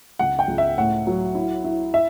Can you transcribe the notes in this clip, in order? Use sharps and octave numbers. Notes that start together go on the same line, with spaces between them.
C#2 F#5
G5
C#2
E5
A2 F#5
F#3
E4
E4
E5